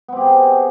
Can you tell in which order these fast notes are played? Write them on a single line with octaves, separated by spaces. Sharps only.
B3 C4 G4 G#4